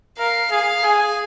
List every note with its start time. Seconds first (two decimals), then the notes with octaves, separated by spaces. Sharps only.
0.18 A#4 F5
0.51 G#4 F5
0.84 G#4 G#5